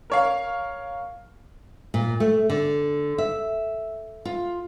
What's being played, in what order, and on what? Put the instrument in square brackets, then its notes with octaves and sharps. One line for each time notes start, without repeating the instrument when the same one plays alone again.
[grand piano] A#4 C#5 F5
[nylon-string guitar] A#2
A3
D3
E5
F4